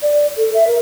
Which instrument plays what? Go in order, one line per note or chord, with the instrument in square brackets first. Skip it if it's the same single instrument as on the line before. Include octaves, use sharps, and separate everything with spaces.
[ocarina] D5
A4
E5
A#4